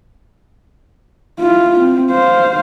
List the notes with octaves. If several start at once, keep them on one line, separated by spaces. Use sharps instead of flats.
E4 F4
C4
C5 F5